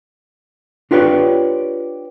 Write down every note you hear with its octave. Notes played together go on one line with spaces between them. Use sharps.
D4 F4 G4 B4 C#5 D5